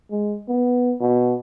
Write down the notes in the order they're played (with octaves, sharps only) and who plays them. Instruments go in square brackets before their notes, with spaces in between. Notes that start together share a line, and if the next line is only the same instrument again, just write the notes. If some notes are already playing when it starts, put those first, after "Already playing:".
[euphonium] G#3
B3
B2